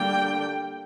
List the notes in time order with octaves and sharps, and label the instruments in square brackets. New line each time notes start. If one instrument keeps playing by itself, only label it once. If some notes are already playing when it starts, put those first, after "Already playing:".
Already playing: [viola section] D3 G3 A#3 D4 G5